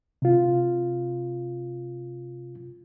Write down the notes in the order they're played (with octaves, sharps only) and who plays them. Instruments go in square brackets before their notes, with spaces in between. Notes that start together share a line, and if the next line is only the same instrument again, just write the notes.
[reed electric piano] C3 F4